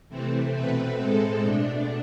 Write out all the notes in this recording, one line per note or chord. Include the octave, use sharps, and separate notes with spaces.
C3 E3 A3 C4
B2 A3 C4 B4
A2 G#3 C4 A4
B2 A3 D4